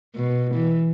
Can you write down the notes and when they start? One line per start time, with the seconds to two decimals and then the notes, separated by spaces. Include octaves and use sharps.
0.16 B2
0.54 E3